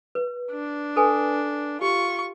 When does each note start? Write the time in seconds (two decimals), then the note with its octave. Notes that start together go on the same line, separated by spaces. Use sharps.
0.15 B4
0.52 D4
0.96 A4 B4 G#5
1.81 F4 G4 C#6